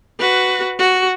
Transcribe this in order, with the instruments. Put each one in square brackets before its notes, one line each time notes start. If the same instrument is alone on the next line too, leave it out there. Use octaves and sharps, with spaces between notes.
[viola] F#4 B4
F#4